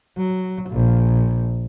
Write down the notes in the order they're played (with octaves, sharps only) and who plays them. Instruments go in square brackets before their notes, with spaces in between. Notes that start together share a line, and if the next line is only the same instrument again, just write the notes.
[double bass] F#3
A#1